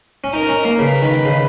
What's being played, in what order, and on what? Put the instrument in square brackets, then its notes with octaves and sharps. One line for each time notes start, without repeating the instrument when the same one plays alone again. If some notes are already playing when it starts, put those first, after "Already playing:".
[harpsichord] C#4
[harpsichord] D#4 [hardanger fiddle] A#4
[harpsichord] C#4
A#3
[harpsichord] C#3 [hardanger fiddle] B4
[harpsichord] D#3
C#3